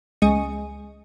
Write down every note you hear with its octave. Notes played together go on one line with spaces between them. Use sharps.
C#2 G#3 D#5 C#7